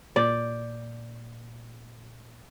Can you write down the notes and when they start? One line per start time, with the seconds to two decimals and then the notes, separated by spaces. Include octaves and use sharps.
0.16 A#2 D5 G6